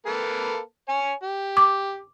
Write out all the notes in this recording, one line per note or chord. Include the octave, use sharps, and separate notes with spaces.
A#3 A4 B4
C#5 G#5
G4
D6